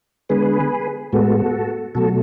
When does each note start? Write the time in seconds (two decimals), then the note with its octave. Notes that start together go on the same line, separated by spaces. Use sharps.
0.29 D3 G#3 B3 G#4 B4
1.12 A2 G#3 B3 F#4 A4
1.95 B2 F#3 A3 F#4 A4